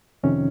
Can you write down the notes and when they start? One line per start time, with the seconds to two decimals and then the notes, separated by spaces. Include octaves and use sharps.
0.23 F2 C3 D#3 C#4